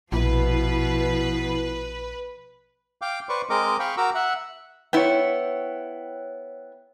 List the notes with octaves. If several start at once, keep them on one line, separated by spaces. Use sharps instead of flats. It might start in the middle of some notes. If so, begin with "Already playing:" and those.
A#1 B2 F3 E4 B4
F5 G5 D6
B4 C5 D5 C#6
G#3 C4 A#4 D#5 D6
F5 G5 B5 C#6
F#4 A#4 A#5 D6 E6
E5 F#5
B3 E4 C#5 G5